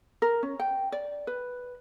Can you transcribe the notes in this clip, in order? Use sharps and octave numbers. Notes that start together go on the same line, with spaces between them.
A#4
C#4
G5
D5
B4